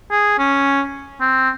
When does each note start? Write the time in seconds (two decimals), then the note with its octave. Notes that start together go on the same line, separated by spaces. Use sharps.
0.11 G#4
0.39 C#4
1.21 C4